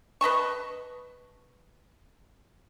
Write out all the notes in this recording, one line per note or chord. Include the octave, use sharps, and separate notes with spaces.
B4 D#5 A5 C#6